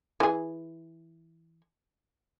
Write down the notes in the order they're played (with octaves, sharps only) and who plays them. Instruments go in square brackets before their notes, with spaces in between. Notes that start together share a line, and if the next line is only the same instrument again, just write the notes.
[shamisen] E3 G#4